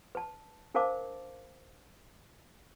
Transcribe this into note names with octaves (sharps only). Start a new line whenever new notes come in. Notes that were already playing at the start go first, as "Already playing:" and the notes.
B4 A5
D4 A#4 C5 F5 A5 D6